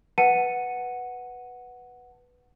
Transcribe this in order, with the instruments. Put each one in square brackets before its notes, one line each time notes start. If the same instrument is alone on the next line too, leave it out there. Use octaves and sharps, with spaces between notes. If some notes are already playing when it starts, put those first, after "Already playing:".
[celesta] B4 F#5 A5 C#7 D#7